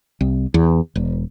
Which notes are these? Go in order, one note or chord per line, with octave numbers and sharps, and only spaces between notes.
C2
E2
E1